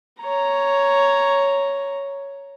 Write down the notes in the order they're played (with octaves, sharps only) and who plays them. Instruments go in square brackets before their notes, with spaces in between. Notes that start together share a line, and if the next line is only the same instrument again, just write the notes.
[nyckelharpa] C#5 A#5